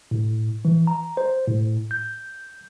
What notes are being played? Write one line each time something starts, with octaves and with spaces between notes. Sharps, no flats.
A2
E3
A#5
C5
A2
G6